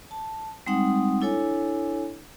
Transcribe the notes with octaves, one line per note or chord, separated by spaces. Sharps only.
A5
G3 G#3 C4 D#4 F#5 D#6
D4 E4 A4 C#5 G#5